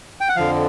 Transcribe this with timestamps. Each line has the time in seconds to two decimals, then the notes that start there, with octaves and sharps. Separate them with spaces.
0.21 G5
0.29 F#5
0.36 F2 D3 F3 F5